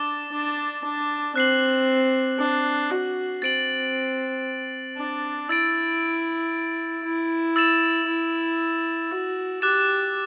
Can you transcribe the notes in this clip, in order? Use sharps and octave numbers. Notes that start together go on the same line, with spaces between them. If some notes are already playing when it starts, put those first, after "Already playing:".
Already playing: D4 D6 A6 E7 G7
D4
D4
C4 F#6 C7 F#7
D4
F#4
C4 A6 D7 F#7
D4
E4 E6 A6 D7
E4
E6 A6 E7
E4
F#4
G4 D6 F#6 A6 E7